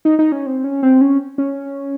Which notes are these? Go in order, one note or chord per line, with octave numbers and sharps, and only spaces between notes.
D#4
D#4
C#4
C4
C#4
C4
C#4
C#4